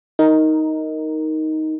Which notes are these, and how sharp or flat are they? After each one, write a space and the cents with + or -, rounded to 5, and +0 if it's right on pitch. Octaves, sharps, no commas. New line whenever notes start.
D#4 +10 A#4 -5